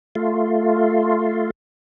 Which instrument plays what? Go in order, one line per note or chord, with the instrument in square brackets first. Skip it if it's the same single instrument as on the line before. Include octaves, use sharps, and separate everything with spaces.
[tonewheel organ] A3 F4